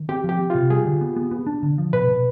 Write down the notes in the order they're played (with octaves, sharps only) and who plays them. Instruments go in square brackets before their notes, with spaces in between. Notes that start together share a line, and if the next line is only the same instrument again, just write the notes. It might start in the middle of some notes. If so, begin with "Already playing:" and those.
Already playing: [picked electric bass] D#3
[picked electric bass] C4 [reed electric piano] G4
[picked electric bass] F3
[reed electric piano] G4
[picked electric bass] C4
[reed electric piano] F4
[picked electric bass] C3
[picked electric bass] G3 [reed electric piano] G#4
[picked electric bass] D3
B3
B3
B3
D4
D3
F3
[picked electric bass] B2 [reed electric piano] B4
[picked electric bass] B2